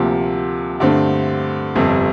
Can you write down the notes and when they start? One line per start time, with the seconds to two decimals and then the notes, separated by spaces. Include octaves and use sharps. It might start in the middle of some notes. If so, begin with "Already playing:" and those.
Already playing: D2 C3 F3 A#3
0.80 G2 D3 A3 C4
1.75 G1 F2 C3